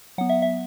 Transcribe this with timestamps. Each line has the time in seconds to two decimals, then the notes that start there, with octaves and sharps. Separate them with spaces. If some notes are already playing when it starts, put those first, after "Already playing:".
0.18 F#3 F#5
0.21 B3
0.29 E5
0.42 E5